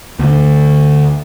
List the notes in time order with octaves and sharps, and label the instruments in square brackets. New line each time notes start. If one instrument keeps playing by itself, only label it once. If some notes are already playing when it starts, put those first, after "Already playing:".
[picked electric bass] D2 D3